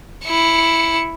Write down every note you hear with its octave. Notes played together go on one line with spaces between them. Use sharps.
E4 C#7